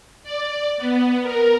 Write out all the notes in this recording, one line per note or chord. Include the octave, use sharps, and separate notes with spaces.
D5
B3
A#4